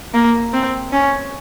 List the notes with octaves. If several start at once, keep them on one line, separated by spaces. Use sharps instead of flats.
A#3
C4
C#4